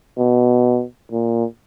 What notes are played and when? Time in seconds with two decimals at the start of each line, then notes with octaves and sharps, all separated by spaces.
0.17 B2
1.12 A#2